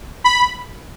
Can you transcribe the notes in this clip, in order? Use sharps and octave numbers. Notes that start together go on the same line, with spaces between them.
B5